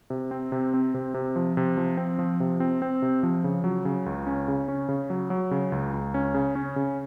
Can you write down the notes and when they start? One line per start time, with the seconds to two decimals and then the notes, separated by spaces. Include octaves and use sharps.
0.10 C3
0.31 C4
0.52 C3
0.74 C4
0.94 C3
1.14 C3
1.36 F3
1.57 C3
1.77 F3
1.97 C4
2.19 F3
2.40 C3
2.60 C4
2.82 C4
3.02 C3
3.23 F3
3.44 C#3
3.64 F#3
3.85 C#3
4.06 C#2
4.27 C#4
4.48 C#3
4.68 C#4
4.89 C#3
5.10 F#3
5.30 F#3
5.51 C#3
5.72 C#2
5.94 C#2
6.14 C#4
6.34 C#3
6.55 C#4
6.76 C#3